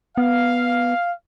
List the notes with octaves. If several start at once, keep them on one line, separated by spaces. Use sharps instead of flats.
B3 F5